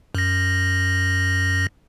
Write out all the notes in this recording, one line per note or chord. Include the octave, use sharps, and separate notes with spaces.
F#2 A#6